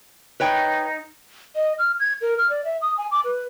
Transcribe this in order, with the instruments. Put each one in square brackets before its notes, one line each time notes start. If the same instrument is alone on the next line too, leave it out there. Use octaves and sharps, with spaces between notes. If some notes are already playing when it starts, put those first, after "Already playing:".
[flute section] D#4 [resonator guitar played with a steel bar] B4 C#5 G5
[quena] D#5
F6
G#6
A#4
F6
D5
E5
D#6
G#5
D6
B4